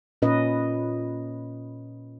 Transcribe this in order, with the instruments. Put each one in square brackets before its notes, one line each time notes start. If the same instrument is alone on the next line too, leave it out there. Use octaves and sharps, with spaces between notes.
[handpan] A#2 C#4 B4 D#5